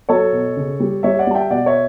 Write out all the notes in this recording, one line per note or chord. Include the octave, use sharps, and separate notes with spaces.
F#3 A4 C#5
B2
C#3
G3
G3 C#5 E5
D5 F#5
G3 A5
E5 G5
B2 D5 F#5
C#5 E5